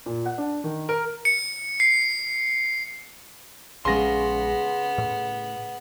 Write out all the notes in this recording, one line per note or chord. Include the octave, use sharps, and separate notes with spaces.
A#2
F#5
D4
D#3
A#4
C#7
C7
A#1 C#3 G#3 B3 C6 A#6
A2